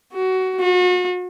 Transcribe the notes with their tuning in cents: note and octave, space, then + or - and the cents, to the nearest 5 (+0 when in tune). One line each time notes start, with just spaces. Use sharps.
F#4 +20
F#4 -40